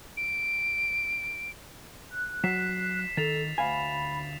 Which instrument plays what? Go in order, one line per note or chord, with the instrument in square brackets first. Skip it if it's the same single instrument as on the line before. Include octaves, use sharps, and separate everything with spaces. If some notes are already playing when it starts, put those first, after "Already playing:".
[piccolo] D7
[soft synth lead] F#6
[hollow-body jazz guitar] F#3 [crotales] B6 C7 E7
[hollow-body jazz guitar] D#3 [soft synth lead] A4 [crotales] A6 E7 F7
[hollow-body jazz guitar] D2 F5 G#5 [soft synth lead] B5